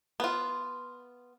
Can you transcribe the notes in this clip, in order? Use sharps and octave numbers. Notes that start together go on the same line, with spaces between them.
B3 F4